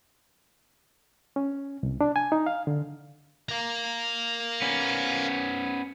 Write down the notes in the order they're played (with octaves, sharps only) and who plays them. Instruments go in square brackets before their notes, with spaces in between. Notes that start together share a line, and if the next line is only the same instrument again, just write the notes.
[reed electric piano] C#4
C2
D4
G#5
D#4
F5
D3
[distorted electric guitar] A#4 F5
[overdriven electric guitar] B3 C#4